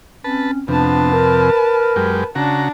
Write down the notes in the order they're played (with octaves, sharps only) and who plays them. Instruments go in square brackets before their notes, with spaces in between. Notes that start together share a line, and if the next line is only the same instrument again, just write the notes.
[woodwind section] C4 C#4 [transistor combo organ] B4 A5
[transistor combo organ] F2 C3 [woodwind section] B3 D4 [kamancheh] B4 A5
[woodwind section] A#4
[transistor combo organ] F#2 G#3 G4
[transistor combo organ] C#3 F#4 A#5 [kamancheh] D4